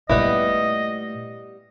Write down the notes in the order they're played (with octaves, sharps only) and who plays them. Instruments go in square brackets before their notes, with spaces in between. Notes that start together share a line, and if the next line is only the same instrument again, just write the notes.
[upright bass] A#2 A3 [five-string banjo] G3 B3 E4 [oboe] D#5